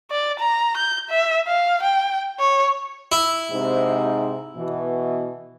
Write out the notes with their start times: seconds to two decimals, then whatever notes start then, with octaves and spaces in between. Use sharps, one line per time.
0.11 D5
0.40 A#5
0.77 G6
1.10 E5
1.48 F5
1.83 G5
2.40 C#5
3.12 E4
3.52 G#2 C3
4.57 B2 E3